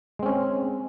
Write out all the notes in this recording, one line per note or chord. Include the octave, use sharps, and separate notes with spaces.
G#3 C4 C#4